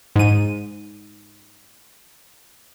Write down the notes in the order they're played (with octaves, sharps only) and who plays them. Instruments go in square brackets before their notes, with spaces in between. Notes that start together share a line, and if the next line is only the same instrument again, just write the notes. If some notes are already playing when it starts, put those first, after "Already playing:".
[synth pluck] G#2 D#7